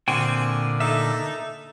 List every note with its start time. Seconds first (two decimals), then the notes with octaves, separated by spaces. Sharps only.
0.08 A#2 D3 C4 F#4 G5 G#5
0.28 G#5
0.80 D#4 A4 E5